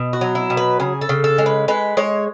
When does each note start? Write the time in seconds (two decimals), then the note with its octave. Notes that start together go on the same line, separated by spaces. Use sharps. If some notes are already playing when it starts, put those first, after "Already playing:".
Already playing: B2
0.13 F#4
0.21 F#3
0.35 E4
0.50 B2
0.57 B4
0.80 C#3 G#4
1.01 A4
1.09 C#3
1.24 A4
1.38 G#3
1.46 B4
1.68 G#3 B4
1.97 G#3 C#5